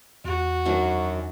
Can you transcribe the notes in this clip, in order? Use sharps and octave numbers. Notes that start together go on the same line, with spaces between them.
E2 F#4
F#2 D#3 F#3 D4